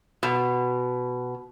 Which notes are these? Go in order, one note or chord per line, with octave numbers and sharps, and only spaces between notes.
B2